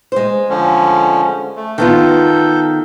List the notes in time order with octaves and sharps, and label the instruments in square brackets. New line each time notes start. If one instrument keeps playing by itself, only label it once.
[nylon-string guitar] G#3 C5
[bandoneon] D3 F3 C#4
A3
[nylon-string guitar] D#3 B3 F4 [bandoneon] A4 G6